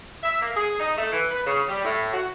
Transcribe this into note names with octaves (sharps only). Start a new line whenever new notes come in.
E5
A#3
G#4
D#4
A3
E3
B4
C#3
G3
A2
F#4